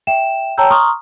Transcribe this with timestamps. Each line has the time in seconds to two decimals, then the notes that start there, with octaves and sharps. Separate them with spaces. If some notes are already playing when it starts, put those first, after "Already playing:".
0.07 E5 G5 E7
0.57 C#5 G5 A5 A#5 E6 G6
0.70 A#5 C6 C#6 D#6 F6